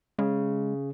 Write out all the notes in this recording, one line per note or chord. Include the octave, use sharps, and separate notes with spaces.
C#3 G#3